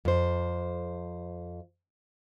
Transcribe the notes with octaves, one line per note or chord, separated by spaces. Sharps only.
F2 C5